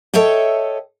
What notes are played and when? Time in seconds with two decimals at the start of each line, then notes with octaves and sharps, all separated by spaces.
0.14 A4 C#5 D#5 E5 G5